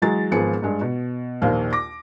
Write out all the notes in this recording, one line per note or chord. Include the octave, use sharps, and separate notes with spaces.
E3 F#3 G#3 A6
G#1 F3 B3 G#4 C#7
G2 G#3
B2
A#1 D#2 C5 F5
D6 A#6